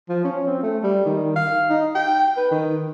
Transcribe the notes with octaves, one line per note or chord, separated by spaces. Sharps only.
F3
C#4
C4
A3
G3
D#3
F5
D#4
G5
B4
D#3